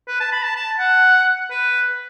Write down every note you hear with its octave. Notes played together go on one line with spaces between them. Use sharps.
B4
A5
B5
A5
A5
F#5
B4